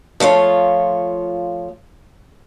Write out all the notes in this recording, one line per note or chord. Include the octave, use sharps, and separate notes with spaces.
F3 A3 F4 C#5